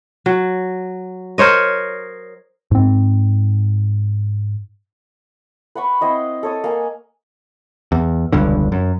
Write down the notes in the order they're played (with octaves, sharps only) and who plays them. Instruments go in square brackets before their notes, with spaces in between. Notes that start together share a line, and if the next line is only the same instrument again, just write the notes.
[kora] F#3
A#4 C5 C#5 D#5
[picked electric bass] G#2 C4
[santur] B4 F#5 B5 C#6
C4 E4 D#5 C6
A4 C#5 D#6
A#3 G#5
[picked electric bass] E2
E1 C#2 G2 D3
F#2